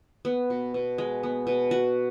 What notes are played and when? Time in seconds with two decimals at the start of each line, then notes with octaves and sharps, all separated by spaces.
0.25 B3
0.50 B2
0.74 B2
0.98 G#3
1.23 B3
1.47 B2
1.71 F#4